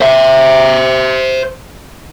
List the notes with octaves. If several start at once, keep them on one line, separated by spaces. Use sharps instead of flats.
C5 E5